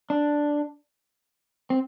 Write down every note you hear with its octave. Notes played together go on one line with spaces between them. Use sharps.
D4
C4